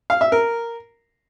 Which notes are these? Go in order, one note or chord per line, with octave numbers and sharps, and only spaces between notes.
F5
E5
A#4